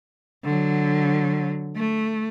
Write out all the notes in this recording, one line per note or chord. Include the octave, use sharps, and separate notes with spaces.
D3 F#3
A3